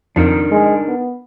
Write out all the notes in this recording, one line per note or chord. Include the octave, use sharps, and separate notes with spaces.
F2 D4 D#4 A#4
G#3
B3